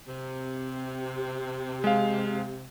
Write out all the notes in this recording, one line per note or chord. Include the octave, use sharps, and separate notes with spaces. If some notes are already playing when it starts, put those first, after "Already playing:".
C3
G#3 F5